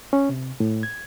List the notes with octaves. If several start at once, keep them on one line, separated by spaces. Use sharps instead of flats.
C#4
C3
A2
G#6